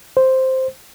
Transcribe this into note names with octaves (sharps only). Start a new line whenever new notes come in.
C5